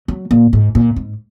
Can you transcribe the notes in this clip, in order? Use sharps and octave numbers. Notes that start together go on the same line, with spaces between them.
F#3
A#2
G#2
A#2
G#2